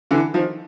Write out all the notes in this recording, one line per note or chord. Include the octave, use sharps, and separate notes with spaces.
D3 E3
D#3 F3